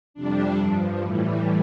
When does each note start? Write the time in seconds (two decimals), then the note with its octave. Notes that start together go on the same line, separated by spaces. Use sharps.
0.14 F2 C3 G3 D4
0.57 G2 F3
1.01 A2 E3 G3